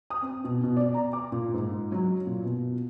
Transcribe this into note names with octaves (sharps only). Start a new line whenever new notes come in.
D#6
C4
B2
B2
D5
A#5
D6
A#2
G#2
F#3
A#2
B2